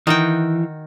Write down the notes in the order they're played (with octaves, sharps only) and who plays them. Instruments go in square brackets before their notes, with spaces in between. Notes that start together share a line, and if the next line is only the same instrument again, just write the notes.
[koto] D#3 F#4 G5 [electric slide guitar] E3